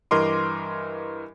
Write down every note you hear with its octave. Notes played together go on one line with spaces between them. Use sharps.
G2 E3 A#4 D#5 C6 D6